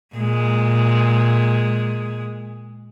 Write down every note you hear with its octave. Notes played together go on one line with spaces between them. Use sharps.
A#2 G#3